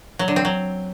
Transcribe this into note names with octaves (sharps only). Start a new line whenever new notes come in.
F#3
D3
C4
F#3